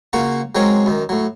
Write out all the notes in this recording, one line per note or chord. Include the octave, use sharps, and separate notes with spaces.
C#3 A#3 F4 F#4 C#6
F#3 G#3 C4 C#4 A#4 C#5
F#2 D#3
A2 F#3